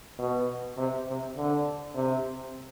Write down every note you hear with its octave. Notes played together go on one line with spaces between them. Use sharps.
B2
C3
C3
D3
C3